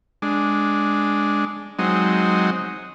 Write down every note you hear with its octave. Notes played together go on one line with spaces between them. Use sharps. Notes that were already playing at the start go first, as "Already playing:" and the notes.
G#3 D4
F#3 G#3 C4 D#4